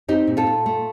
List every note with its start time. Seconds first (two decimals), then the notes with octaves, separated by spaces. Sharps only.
0.08 C4 D#4 G4
0.27 A#2
0.37 F4 A4
0.47 A#2
0.66 A3